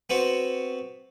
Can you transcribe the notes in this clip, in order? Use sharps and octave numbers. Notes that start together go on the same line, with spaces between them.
B3 C4 F#4